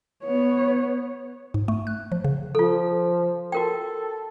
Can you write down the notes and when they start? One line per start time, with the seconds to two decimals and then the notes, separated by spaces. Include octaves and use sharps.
0.24 B3 C#5
1.54 G#2
1.68 A3
1.87 F#6
2.12 F3
2.24 C#3
2.55 F3 F4 A4
3.52 F#4 A4 A#4 G5